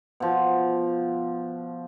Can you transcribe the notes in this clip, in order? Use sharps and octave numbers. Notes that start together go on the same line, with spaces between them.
B2 F3